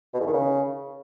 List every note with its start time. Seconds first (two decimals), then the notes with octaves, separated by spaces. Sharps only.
0.14 B2
0.20 E2
0.27 D#3
0.33 C#3